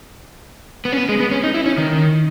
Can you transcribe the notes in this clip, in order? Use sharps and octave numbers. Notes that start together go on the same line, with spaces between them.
B3
C#4
B3
G#3
B3
C#4
D#4
E4
C#4
D#3